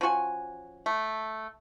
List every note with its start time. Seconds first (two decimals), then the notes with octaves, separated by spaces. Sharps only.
0.01 F3 C#4 F#4 G#5
0.86 A3